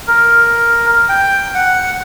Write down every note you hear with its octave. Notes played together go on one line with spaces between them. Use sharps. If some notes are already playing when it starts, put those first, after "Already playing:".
A#4
G5
F#5